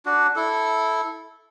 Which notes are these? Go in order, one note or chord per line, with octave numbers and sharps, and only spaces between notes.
D4 F#4
E4 A4